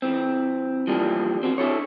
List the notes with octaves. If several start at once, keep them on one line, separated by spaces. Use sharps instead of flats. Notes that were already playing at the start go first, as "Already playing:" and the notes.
E3 C4
E3 F3 G3 A#3 D4
C4 F#4
D4 E4 A4 C#5